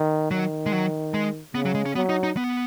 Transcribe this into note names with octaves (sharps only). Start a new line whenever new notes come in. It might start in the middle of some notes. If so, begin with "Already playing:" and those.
Already playing: D#3
D#3 F#3
G#3
F#3
G#3
C#3 B3
F#3
G#3
C#4
F#3 B3
D#4
D#4
B3